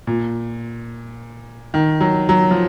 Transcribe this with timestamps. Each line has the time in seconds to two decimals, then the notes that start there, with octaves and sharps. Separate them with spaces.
0.07 A#2
1.74 D#3
2.01 F#3
2.29 F#3
2.51 F3